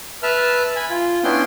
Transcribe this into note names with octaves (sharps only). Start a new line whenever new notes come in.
B4 E5 A5 F6
G#5 B5
F4
B3 C#4 D4 E4 G5 C6